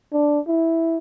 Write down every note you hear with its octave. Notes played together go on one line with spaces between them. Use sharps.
D4
E4